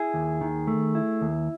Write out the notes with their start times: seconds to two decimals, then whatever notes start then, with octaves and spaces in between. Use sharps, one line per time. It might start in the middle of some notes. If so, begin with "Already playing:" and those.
Already playing: E4 G#4
0.14 D#2
0.41 D#3
0.67 A3
0.95 E4
1.21 D#2